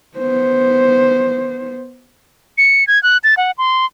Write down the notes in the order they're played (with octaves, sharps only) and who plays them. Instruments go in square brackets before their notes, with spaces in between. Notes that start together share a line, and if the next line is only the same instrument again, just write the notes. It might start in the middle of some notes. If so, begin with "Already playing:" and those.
[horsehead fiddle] B3 C5
[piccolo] C#7
G#6
F#6
A6
F#5
C6